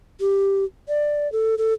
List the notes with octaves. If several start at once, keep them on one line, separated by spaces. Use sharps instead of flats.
G4
D5
A4
A4